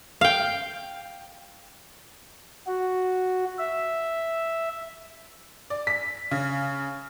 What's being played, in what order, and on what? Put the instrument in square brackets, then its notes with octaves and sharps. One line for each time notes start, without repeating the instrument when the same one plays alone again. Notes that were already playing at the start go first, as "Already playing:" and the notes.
[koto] F5 G5
[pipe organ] F#4
E5
[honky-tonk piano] D5
B6
C#3